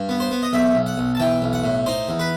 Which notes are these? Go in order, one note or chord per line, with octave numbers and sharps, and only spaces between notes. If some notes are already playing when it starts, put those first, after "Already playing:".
Already playing: G2
B3
C5
B3
D#5
B1 E5
B1
F#5
B1
A5
E3 G5
B1
F#5
A2
D#4 C5
E2
B4